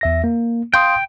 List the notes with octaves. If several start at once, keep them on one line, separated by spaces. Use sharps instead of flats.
E2 E5 A#6
A#3
F5 G5 C6 D#6